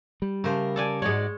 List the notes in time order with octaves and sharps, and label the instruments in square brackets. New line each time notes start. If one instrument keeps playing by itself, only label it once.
[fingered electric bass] G3
[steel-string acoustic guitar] C#3 A#4 [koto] A3 G4 C5
[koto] A4 D5 G#5
[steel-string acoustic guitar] G#2 F#4 D5 [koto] G#3 C#5